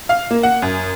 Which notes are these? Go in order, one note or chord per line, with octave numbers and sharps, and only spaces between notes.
F5
A#3
F#5
F#2